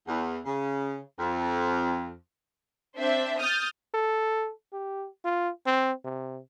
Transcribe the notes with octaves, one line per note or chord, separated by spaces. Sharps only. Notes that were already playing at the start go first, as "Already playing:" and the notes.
E2
C#3
F2
C4 D4 C5 E5
D#6 F6 G6 A6
A4
G4
F4
C4
C3